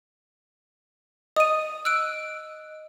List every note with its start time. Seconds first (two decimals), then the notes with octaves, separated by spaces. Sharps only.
1.36 D#5 D#6 D#7
1.85 E6 F#6 D7